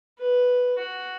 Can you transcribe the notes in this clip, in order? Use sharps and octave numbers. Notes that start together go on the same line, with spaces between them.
B4
F#4